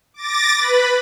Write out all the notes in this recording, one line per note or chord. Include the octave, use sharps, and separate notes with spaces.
D6 A6 A#6
B4 B5